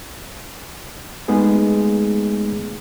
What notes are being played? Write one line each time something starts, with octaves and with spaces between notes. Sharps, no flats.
G#3 A3 B3 D#4 G#4